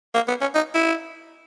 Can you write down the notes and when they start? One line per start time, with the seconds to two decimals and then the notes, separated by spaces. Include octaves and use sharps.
0.15 A#3
0.28 B3
0.41 C#4
0.55 D#4
0.75 E4